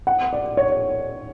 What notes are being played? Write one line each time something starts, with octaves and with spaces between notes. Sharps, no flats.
F#5
D5
C#5